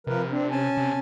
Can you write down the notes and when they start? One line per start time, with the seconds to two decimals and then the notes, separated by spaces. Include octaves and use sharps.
0.07 C3 F3 A#4 B4
0.31 C4 D4
0.51 C#4 G#5 A5
0.77 C3